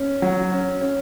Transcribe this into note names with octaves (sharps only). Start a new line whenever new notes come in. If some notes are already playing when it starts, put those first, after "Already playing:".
Already playing: C#4
F#3
C#4
C#4